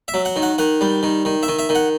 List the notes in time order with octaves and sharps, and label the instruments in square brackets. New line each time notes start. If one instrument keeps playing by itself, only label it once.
[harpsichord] E5
F#3
F#5
D#3
F#5
D#3 F#5
G3
D#3
D#3
E5
D#3
E5
D#3
F#5